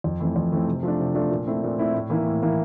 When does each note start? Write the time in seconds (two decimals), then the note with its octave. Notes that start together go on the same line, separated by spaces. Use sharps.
0.04 F2
0.20 E3 A3 C4
0.36 F2
0.52 E3 A3 C4
0.67 C3
0.83 F3 A3 D4
1.00 C3
1.15 F3 A3 D4
1.31 A#2
1.47 A3 C4 E4
1.63 A#2
1.78 A3 C4 E4
1.94 A2
2.10 E3 A#3 E4
2.26 A2
2.43 E3 A#3 E4